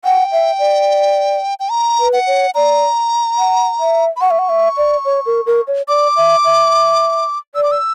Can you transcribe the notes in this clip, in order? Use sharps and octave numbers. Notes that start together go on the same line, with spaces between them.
F#5 G5
E5
D5
G5
A#5
B4
F#5
C#5
D5 A#5
F#5
E5
B5
F#5 C#6
E5
F#5
E5
D5
C#5
A#4
A#4
C#5
D5 D6
E5
E5
D5 E6
D6
E6